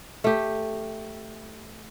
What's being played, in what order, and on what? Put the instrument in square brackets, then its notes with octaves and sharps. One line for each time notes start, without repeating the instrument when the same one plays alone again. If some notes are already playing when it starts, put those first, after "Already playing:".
[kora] A3 G4